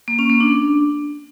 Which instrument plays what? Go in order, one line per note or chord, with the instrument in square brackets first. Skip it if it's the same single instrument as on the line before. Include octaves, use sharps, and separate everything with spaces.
[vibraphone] A#3
C#4
A#3
D4